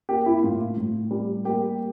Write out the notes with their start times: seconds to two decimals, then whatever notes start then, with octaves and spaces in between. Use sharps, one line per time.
0.09 A#3 G4
0.26 E4
0.43 A2 F4
0.77 A2
1.11 G3
1.45 A#3 G4